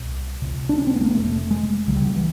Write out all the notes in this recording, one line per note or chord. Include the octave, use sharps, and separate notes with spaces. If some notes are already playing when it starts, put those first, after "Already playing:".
Already playing: C2 B2
C#2 C3
D4
C#4
C4
B3
A3
A#3
F1 F2 C3 A3
G#3
C#2 C#3 F#3
G3
F#3
E3